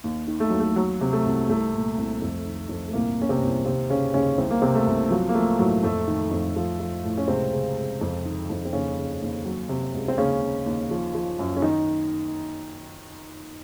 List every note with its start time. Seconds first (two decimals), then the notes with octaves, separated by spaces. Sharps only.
0.04 D#2
0.28 D#3
0.40 A3
0.50 D#2 F#3
0.60 A3
0.76 F#3
1.01 C3
1.13 A3
1.25 C2
1.48 C2 A3
1.73 A#2
1.97 C2
2.22 F2
2.45 D#3
2.69 F2
2.88 A3
2.93 C2 A#2 A#3
3.18 A#2 C#4
3.29 C3 C4
3.43 C2
3.65 D#2 C3 C4
3.90 C#3 C#4
4.14 D#2 C#3 C#4
4.38 C2 C4
4.51 A#3
4.62 C3 C4
4.75 A3
4.87 C2
5.10 F3 F#3
5.29 A#3
5.35 F3 A3
5.59 A2 F#3
5.83 F2 A3
6.08 D#3
6.31 F2
6.56 F3
6.80 F3
7.04 A2
7.18 C#4
7.28 C#2 C3 C4
7.52 C#3
7.77 C#2
8.01 F2
8.25 D#3
8.50 F2
8.65 C4
8.72 D#2 C#3 C#4
8.98 C#3
9.22 D#2
9.45 F#3
9.69 C3
9.94 C#2
10.08 C4
10.18 D#2 C#3 C#4
10.41 C#3
10.66 D#2
10.91 F3
11.15 F3
11.39 F#2
11.57 C#4
11.62 D#3 D#4